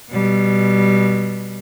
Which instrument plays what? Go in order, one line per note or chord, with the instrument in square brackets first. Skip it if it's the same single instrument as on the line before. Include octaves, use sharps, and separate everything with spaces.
[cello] B2 G3